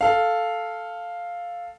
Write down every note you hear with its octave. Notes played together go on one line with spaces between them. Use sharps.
A4 F5